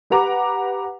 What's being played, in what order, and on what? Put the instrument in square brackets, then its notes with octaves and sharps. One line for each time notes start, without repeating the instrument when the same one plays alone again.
[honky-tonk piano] G4 B4 F#5 A#5 D6